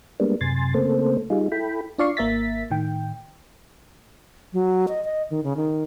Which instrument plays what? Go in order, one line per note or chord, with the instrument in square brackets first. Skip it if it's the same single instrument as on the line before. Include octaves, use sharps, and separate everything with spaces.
[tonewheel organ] G3 G#3 A#3 B3 D4
F#2 C3 G#5 C6 A6
C#3 A3 A#3 C4 A4 C5
G3 D#4 F4 G#4
E4 A4 G5 B5
[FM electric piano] D4 F4 D5 F5 C#6 C7
G#1 A#3 A#4 E5 A6 B6
A2 D#3 G5
[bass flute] F#3
D#5
D#5
D#3
C#3
D#3